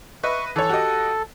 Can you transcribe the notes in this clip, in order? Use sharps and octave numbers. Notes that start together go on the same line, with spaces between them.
B4 D#5 E5 C#6
E3 A4 C#5
F#4 G4 D#5